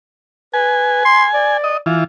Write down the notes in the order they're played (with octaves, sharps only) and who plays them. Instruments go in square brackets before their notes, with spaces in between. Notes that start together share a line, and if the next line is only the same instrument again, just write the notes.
[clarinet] B4 [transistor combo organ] G#5
[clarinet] C6
D5
[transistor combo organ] D#5
E3 F4